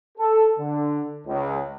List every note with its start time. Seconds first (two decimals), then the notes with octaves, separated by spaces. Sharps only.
0.18 A4
0.59 D3
1.27 C#2